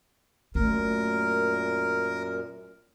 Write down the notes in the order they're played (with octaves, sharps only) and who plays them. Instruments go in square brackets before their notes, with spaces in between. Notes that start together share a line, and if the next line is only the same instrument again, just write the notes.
[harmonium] F#2 A#2 [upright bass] A3 F4 [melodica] A#4